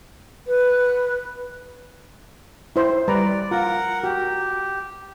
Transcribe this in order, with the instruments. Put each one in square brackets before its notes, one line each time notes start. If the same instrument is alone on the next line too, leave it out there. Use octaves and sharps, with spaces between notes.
[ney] B4
[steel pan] E4 C5
[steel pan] G3 B4 A#5 [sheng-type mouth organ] D5
[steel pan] F4 [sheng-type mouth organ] A#4 F#5
[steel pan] F#4 [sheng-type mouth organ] G4